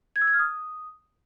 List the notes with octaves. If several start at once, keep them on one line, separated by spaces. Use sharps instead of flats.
G#6
E6
G#6
F6
D#6